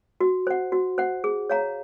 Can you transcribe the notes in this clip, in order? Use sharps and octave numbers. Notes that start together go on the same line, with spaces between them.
F#4
C5 F#5
F#4
C5 F#5
G#4
C#5 F5 A#5